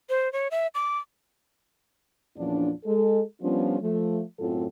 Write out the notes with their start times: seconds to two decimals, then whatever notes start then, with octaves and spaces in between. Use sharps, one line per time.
0.09 C5
0.33 C#5
0.51 E5
0.75 D6
2.38 E2 A#2 F3 C#4 D4
2.85 G#3 A4
3.41 F3 G3 B3 C#4 D4 F4
3.81 F3 A3
4.39 F#2 A2 C4 F4 A4